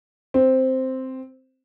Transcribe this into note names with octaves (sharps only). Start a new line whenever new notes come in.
C4